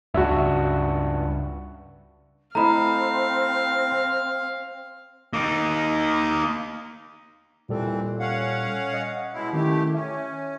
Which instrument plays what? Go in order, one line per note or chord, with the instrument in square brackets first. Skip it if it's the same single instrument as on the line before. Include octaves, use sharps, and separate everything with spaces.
[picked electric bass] C#2 G2 [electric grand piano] F#4 E5
[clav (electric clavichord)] A3 E4 D#5 [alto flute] C4 [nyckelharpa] F5 [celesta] A#5 B5
[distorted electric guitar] A#3 D#4
[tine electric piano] A#2 G3 A4 [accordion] E3 C4
[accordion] C#4 F5 F#5
[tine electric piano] D#5
[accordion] B2 G#3 E4
[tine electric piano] D#3 C#4 E4 [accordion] A3 G4
[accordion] C#4 [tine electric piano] E5